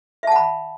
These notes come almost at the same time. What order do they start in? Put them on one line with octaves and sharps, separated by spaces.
E5 A5 F#5 B5